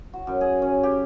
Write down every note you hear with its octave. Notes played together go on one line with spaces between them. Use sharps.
F#4
F#2
G#4
C#4
G4